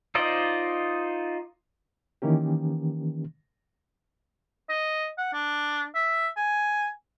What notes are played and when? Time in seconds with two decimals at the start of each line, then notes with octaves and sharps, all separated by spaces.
0.15 D#4 F4 C5 D5 D#5
2.22 D#3 E3 A#3 C#4 G4
4.69 D#5
5.18 F#5
5.33 D4
5.95 E5
6.37 G#5